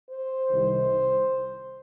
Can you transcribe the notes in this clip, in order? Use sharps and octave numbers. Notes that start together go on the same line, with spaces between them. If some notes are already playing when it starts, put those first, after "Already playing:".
C5
C2 C3 D#3